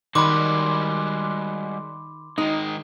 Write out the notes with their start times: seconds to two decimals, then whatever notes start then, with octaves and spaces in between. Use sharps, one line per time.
0.15 D#3 G3 G#3 F#4 B5 C6 D6
2.38 D#3 G#3 D#4